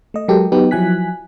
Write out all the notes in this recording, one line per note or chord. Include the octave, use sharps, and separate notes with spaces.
A3 D#5
F#3 G#3 G4 A4 A#4
F#3 B3 D#4 G4 B4
F3 F#3 E4 G#5 F#6 B6